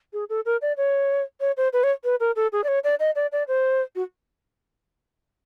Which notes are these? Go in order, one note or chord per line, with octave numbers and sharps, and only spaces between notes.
G#4
A4
A#4
D5
C#5
C#5
C5
B4
C#5
B4
A#4
A4
G#4
D5
C#5
D5
D#5
D5
D5
C5
F#4